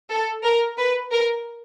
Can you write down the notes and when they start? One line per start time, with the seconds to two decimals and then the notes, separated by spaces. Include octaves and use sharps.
0.11 A4
0.44 A#4
0.78 B4
1.12 A#4